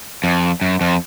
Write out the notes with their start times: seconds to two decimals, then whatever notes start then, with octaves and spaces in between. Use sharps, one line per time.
0.24 F2
0.62 F#2
0.81 F2